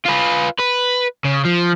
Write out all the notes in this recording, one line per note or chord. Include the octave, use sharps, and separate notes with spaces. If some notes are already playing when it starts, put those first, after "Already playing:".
F4 B4
B4
C#3
F3